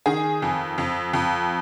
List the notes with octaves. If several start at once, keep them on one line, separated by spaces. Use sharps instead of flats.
D#3 G#4
F2
F2
F2